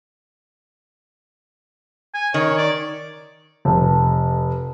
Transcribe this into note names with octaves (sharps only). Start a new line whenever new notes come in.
G#5
D#3 C#5
D5
F1